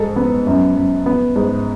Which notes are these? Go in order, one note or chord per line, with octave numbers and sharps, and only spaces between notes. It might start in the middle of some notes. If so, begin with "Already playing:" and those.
Already playing: G#2 G#3 A4
B3
F#2
F#2
B3
G#2